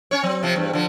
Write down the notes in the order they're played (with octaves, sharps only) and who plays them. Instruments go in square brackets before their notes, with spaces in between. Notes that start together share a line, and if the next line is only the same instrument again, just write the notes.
[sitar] C#4 C#5
F#3 C4
C3 F3
E2 G2
D3 F3